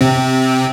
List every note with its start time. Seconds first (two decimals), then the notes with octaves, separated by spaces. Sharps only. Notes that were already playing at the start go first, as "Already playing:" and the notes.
0.01 C3 C4